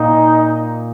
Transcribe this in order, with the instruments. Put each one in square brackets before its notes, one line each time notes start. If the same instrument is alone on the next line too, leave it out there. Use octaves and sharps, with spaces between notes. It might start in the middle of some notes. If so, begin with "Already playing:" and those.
Already playing: [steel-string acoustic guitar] A#2 [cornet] D#4